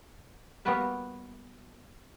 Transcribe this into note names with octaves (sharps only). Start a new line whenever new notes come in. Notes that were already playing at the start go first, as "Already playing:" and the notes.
G3 A#3 B3 F#4 B4 E5